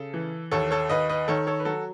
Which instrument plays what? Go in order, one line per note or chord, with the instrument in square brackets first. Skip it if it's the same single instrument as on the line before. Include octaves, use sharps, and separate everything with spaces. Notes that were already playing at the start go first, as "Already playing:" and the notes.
Already playing: [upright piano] C#3 A4
E3
D#2 A4 C#5
A4 C#5
D#2 B4 D#5
B4 D#5
D#3 A4 C#5
A4 C#5
B4
F#3 F#4 A4